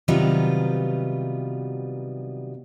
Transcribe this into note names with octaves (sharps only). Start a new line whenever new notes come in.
C3 D#3 F#3 G3 B3 F4